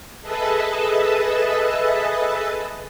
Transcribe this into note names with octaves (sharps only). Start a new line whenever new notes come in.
G#4 A4 B4 D#5 E5 A5